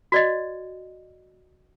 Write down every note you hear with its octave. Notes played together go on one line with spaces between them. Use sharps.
F#4 D5 D#5